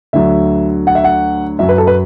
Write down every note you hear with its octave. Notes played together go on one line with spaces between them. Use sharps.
D2 D3 F#3 E5
F#5
E5
F#5
F#2 F#3 E5
B4
A4
B4